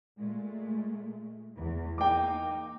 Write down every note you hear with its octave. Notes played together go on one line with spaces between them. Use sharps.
A#2 G#3 A3
E2
A#3 D#4 G5 D6